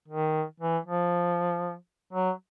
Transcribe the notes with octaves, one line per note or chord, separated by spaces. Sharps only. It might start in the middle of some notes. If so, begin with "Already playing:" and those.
D#3
E3
F3
F#3